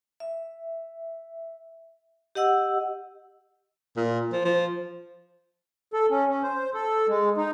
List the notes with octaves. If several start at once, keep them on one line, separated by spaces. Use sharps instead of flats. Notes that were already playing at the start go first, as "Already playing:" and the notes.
E5
G4 D#5 F#5 E6
A#2
F3
F3
A4
C#4
C#4
C5
A4
G#3
D#4